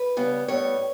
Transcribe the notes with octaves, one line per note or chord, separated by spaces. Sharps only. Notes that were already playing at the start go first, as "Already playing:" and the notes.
Already playing: B4
C#3 G3 B3
A2 G3 B3 C#5